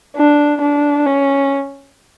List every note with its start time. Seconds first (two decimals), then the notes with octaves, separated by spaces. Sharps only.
0.16 D4
0.61 D4
1.07 C#4